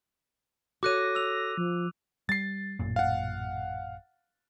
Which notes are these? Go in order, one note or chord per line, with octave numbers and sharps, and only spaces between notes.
F#4 A4 C#5 D6 F#6 A#6 D#7
E6 F7
F3
G3 A6 C7
A1 F#2 A#2
F5 F#5